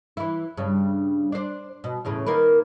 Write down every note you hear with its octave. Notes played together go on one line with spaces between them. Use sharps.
E3 E4
G2 C#3
D4 C5
B2
E2 A2 C#3
D#3 A#3 B4